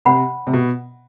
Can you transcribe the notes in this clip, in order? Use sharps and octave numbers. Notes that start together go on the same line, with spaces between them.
C3 C5 F#5 B5
C3
B2